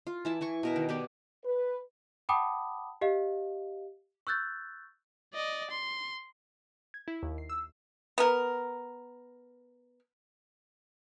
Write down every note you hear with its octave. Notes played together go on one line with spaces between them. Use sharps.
F4
E3 E4 A5
E3 G#5 C#6
B2 A#4 E5
D#3
B3 G4 D5
B4
F#5 G5 A5 B5 D6 D#6
G4 D#5 F5
C#6 E6 F#6 G6 A6
D5 D#5
C6
G#6
E4
D#2
C7
E6
B3 A#4